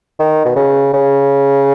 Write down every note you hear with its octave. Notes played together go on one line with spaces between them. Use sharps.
D#3
B2
C#3
C#3